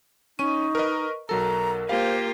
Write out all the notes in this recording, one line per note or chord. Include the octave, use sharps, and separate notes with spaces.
C#4 D#4 C#6 D#7
A#4 B4 D#5
B1 F#3 A4 A#4 A#5
A#3 F4 G4 C5 F5